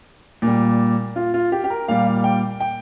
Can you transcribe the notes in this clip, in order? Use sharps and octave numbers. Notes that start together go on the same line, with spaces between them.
A#2
G3
F4
F4
G4
G4
A#4
A#2 G3 F5
F5
G5
G5